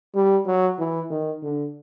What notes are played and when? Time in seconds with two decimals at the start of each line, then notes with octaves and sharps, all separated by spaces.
0.15 G3
0.46 F#3
0.79 E3
1.10 D#3
1.43 D3